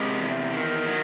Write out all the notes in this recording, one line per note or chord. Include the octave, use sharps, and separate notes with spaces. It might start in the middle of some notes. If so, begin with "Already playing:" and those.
Already playing: C3 G#3
E2
D#3
F#3